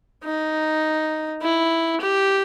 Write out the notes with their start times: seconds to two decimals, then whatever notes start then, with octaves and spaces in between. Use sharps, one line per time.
0.24 D#4
1.42 E4
2.01 G4